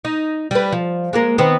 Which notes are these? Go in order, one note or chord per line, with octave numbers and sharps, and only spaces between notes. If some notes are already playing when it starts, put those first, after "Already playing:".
D#4
G3 B4
F3
G#3 A#3 A#4
D#3 B3 C4